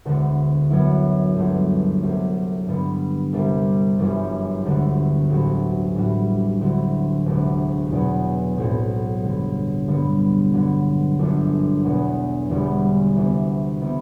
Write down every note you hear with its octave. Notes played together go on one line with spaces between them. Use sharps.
E1 D2 D3
F#2 F#3 B3 E4
G1 F#2 F#3 A3
C2 C3 F#3 A3
G2 D3 G3 B3
C2 C3 G3
G1 F#2 E3 G3
E1 D2 D3
A1 A2 F#3 C4 F#4
A2 E3 G3 D4 F#4
D2 D3 F#3 C4 E4
E1 D2 C3
E2 B2 F#3
B1 A2 F#3 C4 F#4
G2 D3 F#3
G2 D3 G3 B3
G2 D3 F#3
G1 F#2 D3 A3 D4
E2 B2 F#3
E1 E2 D3 G3
D2 C3 E3 B3
C3 G3 B3 E4